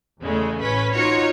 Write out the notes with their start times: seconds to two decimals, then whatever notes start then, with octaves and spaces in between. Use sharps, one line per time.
0.22 E2 C#3 G#3 A3
0.60 A1 C#4 B4 B6
0.94 D#4 F4 F#4 C#5 A#5 C#7